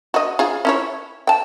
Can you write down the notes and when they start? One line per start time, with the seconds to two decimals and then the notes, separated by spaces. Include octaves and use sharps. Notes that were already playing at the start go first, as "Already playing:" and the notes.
0.14 F#4 D#5
0.39 F4 G#4
0.65 C#4 E4 C#5
1.27 G5 A5